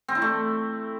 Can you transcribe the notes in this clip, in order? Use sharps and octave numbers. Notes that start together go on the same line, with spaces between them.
C4
E4
A3